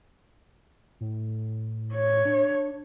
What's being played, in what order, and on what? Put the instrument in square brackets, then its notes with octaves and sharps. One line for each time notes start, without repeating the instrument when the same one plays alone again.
[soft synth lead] A2
[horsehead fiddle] C#5
[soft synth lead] D4